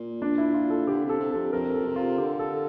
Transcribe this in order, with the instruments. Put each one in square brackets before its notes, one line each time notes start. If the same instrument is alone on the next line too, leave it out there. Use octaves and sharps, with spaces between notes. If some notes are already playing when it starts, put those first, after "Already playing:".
Already playing: [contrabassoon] A#2
[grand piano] D4
E4
F4
A4
[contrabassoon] D3 [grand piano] G4
[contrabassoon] C3
[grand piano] A4
[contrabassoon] C3
[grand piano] A4
[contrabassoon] F2
[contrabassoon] F2 [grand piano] A#4
[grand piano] A4
[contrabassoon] C3
[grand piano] F4
[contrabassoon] D3 [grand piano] G4
[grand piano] A4